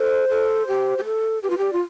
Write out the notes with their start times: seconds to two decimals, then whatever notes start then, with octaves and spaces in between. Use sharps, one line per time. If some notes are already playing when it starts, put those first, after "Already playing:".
Already playing: A4 C5
0.29 A4
0.68 G4
0.98 G4
1.05 A4
1.43 G4 B4
1.50 F4
1.58 G4 D5
1.73 F4